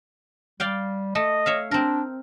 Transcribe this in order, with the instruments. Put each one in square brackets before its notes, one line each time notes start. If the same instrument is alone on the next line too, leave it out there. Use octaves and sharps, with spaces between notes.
[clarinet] G3 [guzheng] D5 F5 G5
[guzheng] A3 [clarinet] D#5
[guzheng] C#5 E5 F5
[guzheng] C4 A#4 [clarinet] D4